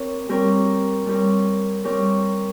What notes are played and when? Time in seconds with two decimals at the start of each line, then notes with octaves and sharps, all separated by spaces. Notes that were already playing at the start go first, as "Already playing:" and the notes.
Already playing: C4 G4 A#4 C#5
0.29 G3 C4 G4 A#4 C#5
1.06 G3 C4 G4 A#4 C#5
1.84 G3 C4 G4 A#4 C#5